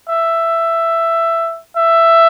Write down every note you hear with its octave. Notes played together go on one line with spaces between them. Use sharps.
E5
E5